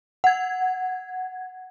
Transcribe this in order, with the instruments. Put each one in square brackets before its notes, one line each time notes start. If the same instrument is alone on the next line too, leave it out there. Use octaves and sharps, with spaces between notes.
[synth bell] F#5 G#6